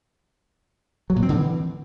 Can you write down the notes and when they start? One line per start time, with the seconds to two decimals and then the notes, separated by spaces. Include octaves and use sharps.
1.10 F#3
1.16 A#2
1.22 C4
1.29 D3
1.35 E3